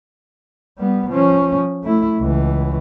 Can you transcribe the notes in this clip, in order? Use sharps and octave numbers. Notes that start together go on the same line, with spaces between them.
G3 B3
F3 C#4
A3 E4
C#2 E3